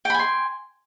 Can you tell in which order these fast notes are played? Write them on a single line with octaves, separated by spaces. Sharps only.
G5 B5 G#5 C6